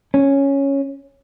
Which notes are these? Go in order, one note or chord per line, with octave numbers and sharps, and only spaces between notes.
C#4